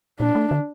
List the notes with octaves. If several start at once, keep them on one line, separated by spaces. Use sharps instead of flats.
A#2 D4
A3
D3